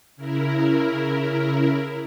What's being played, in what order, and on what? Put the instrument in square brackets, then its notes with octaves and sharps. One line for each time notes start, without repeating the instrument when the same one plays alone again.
[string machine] C#3 E4 A#4